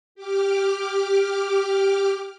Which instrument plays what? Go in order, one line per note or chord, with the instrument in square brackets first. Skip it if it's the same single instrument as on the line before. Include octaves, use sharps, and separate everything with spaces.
[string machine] G4 D6 F6